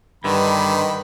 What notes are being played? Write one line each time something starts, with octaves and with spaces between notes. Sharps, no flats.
G2 D3 D#3 G3 B4 D#5 B5